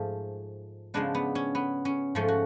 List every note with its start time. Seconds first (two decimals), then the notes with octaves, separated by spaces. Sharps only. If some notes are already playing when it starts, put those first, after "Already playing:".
Already playing: G#2 F3 A3
0.94 C#3 F3 G#3 B3 D4
1.15 B3
1.35 C#4
1.55 B3
1.85 C#4
2.15 G#2 F3 A3 C#4
2.28 F#4